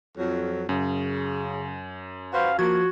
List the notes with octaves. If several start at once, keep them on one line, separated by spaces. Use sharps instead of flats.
F2 F#3
F#2 C#3
F#4 B4 C5 F5
F3 A#3 F#4 G#6